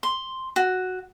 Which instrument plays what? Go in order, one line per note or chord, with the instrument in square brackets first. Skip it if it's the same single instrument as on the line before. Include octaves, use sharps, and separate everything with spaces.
[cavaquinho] C6
F#4